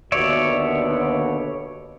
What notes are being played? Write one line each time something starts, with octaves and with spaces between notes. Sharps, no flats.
D#2 B2 D3 C#5 D5 E5